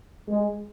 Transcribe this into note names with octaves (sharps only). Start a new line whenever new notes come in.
G#3